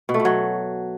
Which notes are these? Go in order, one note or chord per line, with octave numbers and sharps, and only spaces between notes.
B2
A3
B2
F#3